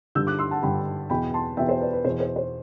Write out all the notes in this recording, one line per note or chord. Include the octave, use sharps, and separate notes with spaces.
G2 D3 E6 G6
D6 F#6
C6 E6
F#5 A5
G2 D3 G5 B5
E2 B2 G5 B5
A5 C6
E2 B2 E5 G5
C5 E5
B4 D5
B4
E2 B2 C5
C5
C5